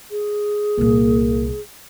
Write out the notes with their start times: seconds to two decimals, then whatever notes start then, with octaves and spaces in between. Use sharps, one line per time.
0.11 G#4
0.78 C2 A#2 A#3